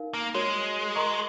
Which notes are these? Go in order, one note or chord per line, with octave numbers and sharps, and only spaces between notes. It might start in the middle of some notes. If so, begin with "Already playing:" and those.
Already playing: D#4 A#4 F5
A#3
G#3 F#4 A#4 C#5
A#4 D#5 A#5 C#6